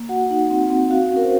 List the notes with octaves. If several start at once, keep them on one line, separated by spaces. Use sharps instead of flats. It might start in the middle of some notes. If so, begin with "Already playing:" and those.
Already playing: A#3
F#4 F#5
D#4
C4
C4
F#4 F5
C#4
A#4
C5